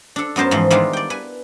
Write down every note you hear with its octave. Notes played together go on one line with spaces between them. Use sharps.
D4 A4
F#2 B3 A#4 C5 A5
G#2 E3 F3
D#3 G3 G#3 D4 E4 F4
D5 G5
B4 G#5